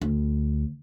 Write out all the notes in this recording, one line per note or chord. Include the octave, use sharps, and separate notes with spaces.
D2